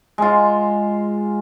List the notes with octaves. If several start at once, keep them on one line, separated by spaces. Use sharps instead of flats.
G#3 F4